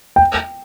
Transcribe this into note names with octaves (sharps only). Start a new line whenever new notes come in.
G5